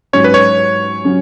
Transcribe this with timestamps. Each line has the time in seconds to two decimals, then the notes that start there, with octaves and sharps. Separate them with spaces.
0.13 G#2 F#3 C#4 C#5
0.24 B4
0.34 C#5
1.05 F#3 C#4